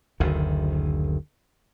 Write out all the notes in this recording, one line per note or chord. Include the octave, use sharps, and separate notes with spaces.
F#1 D2 D3 D#3